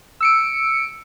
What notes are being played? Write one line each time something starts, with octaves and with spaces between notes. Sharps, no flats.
E6 C#7 D7